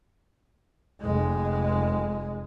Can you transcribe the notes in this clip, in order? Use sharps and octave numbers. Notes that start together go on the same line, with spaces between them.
F1 G#3